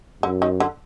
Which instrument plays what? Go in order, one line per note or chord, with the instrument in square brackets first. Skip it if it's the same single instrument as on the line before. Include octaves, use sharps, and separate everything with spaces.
[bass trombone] F#2 [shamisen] D3
[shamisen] D#3
D3